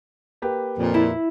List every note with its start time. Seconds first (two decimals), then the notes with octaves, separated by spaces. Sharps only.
0.42 A#3 G4 B4
0.79 F2 A#2
0.94 E4